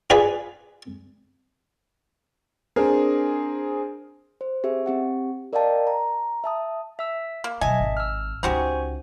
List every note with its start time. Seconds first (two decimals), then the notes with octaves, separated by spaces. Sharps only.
0.10 F4 G#4 B4 D5 G#5 B5
2.76 C4 D4 G#4 A#4
4.41 C5
4.64 C4 G4 G#4 E5
4.86 C4 G4 F#5
5.53 A#4 D5 D#5 F5 G5 A5
5.87 A#5
6.44 E5 A5 D#6
6.99 E5 E6
7.44 A#3
7.61 B2 F#3 D#5 E5 G#5 A5
7.80 G#1
7.97 E6 F6
8.43 C#2 C#3 D#4 F#4 G4 C5 G#5 C#6